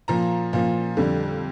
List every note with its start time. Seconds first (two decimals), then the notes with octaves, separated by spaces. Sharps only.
0.08 A#2 F3 A#5
0.53 A#2 F3
0.97 F2 D3 G3